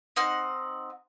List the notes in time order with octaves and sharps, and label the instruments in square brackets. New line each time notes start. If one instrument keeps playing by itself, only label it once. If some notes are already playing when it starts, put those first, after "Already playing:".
[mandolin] C4 D#4 F#5 F6